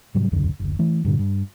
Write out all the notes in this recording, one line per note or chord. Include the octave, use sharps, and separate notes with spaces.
G#2 C3 F#3 G3
E1 C#2 F#2 D3
F#1 D2
E3 A3
G2 A#2 D3
G2